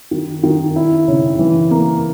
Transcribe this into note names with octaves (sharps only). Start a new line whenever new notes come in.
D#3
D#3
E4
C#3
E3
A#3